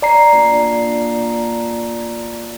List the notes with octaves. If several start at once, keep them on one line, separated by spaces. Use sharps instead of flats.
D5 A#5 C7
A#2 D4 G#4